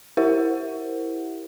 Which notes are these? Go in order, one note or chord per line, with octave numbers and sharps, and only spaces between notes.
E4 G4 A#4 C5 E5 F#5